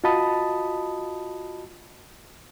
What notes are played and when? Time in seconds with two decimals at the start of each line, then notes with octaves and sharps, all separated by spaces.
0.04 F4 F#4 D#5 A5 B5 D#6